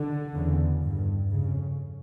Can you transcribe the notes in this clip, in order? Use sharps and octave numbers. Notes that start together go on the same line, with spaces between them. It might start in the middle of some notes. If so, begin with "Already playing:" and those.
Already playing: D3
E2 C#3
G2
F2 C#3